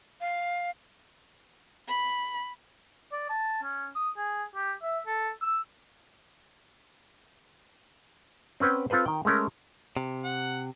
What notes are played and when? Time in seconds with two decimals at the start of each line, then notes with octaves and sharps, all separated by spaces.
0.21 F5
1.88 B5
3.12 D5
3.29 A5
3.63 C#4
3.95 D#6
4.17 G#4
4.55 G4
4.83 E5
5.07 A4
5.42 E6
8.60 C4 C#4 B4 F#5 G5
8.90 C4 F4 A4 B4 C5
9.06 D#3 G5
9.25 G#3 A3 C#4 A#4
9.97 C3
10.24 F#5